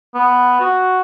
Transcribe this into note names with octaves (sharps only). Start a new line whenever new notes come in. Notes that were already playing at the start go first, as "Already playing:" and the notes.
B3
F#4